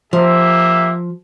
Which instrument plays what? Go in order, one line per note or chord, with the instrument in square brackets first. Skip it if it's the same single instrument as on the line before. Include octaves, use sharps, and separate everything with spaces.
[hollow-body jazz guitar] F3 [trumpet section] A#3 G4 E5